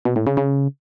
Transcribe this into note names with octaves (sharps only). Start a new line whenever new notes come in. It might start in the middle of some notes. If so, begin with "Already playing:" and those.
B2
A2
C#3
C#3